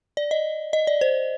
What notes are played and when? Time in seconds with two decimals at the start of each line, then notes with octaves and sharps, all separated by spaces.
0.17 D5
0.31 D#5
0.73 D#5
0.87 D5
1.01 C5